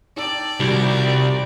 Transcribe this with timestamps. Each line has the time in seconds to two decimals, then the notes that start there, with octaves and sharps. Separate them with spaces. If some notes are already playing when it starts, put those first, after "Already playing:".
0.16 D#4 D5 G5 A5 E6
0.60 C2 D#3 F3 G3 F#4